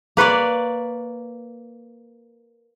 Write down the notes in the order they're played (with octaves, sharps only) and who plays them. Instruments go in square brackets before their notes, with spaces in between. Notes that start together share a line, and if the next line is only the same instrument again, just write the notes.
[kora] A#3 B4 C#5 D5